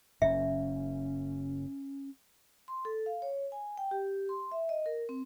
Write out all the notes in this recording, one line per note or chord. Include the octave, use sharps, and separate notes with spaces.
F#1 F#2 C#4 E5
C6
A4
F5
C#5
G#5
G5
G4
C6
E5
D#5
A#4
C4